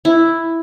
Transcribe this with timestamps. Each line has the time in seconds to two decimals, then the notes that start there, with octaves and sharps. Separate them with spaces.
0.05 E4